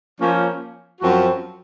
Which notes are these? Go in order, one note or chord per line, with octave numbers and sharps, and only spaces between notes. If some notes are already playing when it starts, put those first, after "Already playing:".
F3 A#3 C#4
F#2 F3 C4 F#4